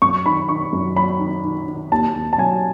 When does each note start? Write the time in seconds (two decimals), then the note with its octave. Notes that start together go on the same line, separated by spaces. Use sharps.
0.02 F#2 C#6
0.26 D#3 B5
0.49 D#3 C#6
0.73 F#2
0.96 F#3 B5
1.20 D#3
1.44 D#3
1.68 D#3
1.92 D#2 A5
2.16 D#2
2.33 A5
2.38 F#3 G#5